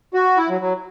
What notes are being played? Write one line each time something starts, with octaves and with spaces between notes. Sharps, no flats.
F#4
E4
F#3
F#3